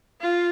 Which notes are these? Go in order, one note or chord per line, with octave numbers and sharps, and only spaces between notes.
F4